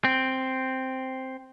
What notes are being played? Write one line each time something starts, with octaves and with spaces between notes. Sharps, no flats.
C4